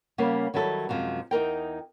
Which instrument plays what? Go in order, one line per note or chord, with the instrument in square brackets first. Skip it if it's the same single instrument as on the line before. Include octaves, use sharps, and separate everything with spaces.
[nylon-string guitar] C#3 G3 A#3 B3 C#4
D#3 F#3 G3 E4 A4
F#2 C3 F3 G#3
E2 D#4 A#4 G5